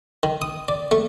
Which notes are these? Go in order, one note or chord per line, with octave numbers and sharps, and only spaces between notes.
D#3
D#6
D5
A3